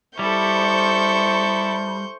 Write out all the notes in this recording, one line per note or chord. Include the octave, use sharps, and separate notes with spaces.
G3 E4 A4 C5 C#6 G6